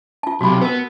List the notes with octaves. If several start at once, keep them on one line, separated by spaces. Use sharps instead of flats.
F4 A5
B1 C3 F#4 B5
B3 A#4 B4